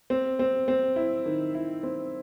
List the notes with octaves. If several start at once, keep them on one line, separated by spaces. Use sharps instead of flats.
C4
C4
C4
E4
D#3
E4
C4